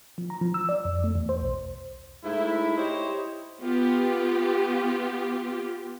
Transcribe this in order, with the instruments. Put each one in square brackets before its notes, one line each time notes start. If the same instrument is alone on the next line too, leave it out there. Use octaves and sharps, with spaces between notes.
[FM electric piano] F3
A#5
F3
E6
D5
F2
A3
E2
C5
B1
[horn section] G#2 A3 E4
E4 G4 C5 C#5 D#5
[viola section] B3 F4 G4